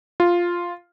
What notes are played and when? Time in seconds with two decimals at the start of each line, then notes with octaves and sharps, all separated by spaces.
0.20 F4